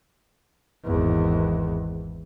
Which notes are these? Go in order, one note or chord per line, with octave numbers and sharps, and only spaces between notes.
G#1 E2